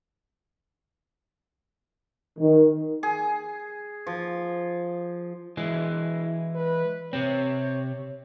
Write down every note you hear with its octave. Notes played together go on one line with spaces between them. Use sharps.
D#3
G#4
F3
E3 G#3 E4
B4
C3 C4 C#5